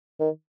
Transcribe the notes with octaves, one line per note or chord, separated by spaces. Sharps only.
D#3